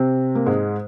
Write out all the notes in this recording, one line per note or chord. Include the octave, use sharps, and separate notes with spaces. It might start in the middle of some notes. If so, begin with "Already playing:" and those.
Already playing: C3 C4
A#3
G#2 G#3